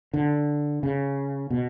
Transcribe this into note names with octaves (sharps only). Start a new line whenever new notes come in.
D3
C#3
B2